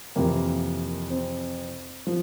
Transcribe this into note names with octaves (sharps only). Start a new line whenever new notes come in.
F2 C3 E3 A#3
C4
F3